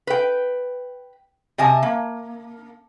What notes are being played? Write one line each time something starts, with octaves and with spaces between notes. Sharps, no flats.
B4 G5
C3 D#5 G#5 A5
A#3